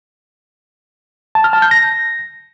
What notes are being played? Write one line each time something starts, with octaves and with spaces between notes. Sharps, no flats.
A5
F6
A5
G6
A#6